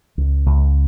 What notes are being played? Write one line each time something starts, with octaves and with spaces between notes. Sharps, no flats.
C#2
C#2